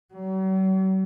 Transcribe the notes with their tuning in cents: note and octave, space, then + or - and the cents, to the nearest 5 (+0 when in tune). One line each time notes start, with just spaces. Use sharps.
F#3 +45